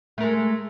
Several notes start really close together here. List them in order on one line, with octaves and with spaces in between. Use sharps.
A3 A#4 G#3